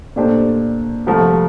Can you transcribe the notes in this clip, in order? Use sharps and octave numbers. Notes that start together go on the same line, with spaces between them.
A#2 A3 D4 G4 C5
C2 C3 F3 A3